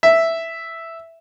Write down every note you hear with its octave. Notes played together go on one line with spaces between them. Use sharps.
E5